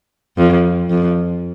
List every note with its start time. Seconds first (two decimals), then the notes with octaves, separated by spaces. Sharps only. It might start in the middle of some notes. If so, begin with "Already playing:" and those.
0.38 F2
0.90 F2